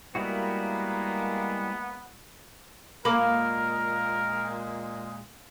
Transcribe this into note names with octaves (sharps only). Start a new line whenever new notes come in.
G3 G#3 A#3 B3 E4 F#4
A#2 G#3 A#3 A#4 B5 D6